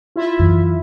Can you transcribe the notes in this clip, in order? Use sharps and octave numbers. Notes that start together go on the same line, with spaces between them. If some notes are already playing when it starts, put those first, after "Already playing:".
E4 F4 E5
F#2 E3